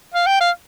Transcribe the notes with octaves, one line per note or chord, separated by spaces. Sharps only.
F5
G5
F5